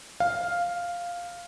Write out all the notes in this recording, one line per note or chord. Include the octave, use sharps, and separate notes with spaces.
F5